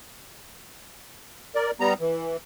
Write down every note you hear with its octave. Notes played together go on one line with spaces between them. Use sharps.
A#4 D5
G3 B3 A#5
E3